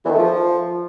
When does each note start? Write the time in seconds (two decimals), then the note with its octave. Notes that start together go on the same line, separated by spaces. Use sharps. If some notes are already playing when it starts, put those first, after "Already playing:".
0.04 E2
0.09 D#3
0.14 A3
0.19 F3